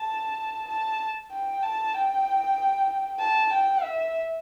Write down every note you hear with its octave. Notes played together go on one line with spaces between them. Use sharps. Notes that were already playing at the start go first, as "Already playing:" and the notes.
Already playing: A5
A5
G5
A5
G5
A5
G5
E5